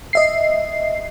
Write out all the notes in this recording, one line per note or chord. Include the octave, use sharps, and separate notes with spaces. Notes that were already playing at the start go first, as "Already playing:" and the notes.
D#5 E5 C7